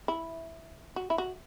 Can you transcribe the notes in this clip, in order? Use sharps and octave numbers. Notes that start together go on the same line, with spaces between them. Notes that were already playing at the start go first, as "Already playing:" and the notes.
E4
F#4
E4
F#4